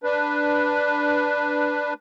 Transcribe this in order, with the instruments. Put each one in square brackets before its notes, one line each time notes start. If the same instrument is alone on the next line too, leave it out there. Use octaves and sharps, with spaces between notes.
[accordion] D4 B4